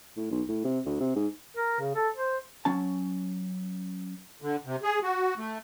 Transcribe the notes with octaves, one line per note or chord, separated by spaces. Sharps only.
A2
B1
A2
C3
D2
C3
G#2
A#4
C#3
A4
C5
F#3 C#4 A5
D3
C3
G#4
F#4
A3